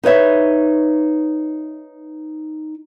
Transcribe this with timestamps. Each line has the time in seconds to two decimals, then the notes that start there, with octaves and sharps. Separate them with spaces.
0.03 D#4 B4 C#5 E5